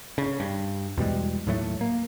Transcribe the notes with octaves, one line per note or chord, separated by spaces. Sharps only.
C#3
G2
E2 B2 G3 G#3
D#2 A2 F#3 A3
A#3